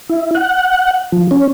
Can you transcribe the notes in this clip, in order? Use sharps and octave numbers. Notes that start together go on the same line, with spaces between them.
E4
F#5
F3
C#4